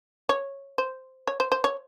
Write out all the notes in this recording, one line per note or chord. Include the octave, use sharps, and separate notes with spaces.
C#5
C5
C#5
C5
C5
C#5